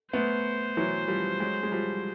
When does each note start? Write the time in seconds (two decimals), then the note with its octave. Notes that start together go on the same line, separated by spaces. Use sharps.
0.13 A3 B3 C5
0.77 E3 F#3
1.08 F3 G3
1.40 F#3 G#3
1.63 G#3
1.72 F3 G3